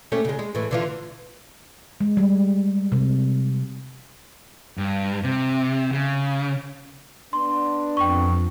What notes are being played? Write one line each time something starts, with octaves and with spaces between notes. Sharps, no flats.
A3 C#4 G4
C#3 G#3
G#3
A2 E3
D3 E3 F4
G#3
G3
C3
G2
C3
C#3
B3 D4 C6
F2 G5 C#6